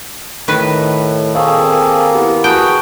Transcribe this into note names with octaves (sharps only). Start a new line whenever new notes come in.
A2 D#3 B4 F#6
A#2 C4 G#4 A4 D5 F5 C#6
A#3 D5 F5 G#5
B3 E4 G4
F#4 G#4 B4 G5 A5 B5 C#6